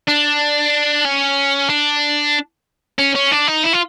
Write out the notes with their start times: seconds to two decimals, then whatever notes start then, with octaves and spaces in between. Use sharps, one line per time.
0.08 D4
1.05 C#4
1.70 D4
2.99 C#4
3.15 C#4
3.32 D4
3.48 D#4
3.64 E4
3.73 F4